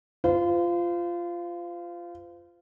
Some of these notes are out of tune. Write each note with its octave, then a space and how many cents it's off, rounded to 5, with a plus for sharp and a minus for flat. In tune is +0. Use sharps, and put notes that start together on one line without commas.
F4 -10 C5 -35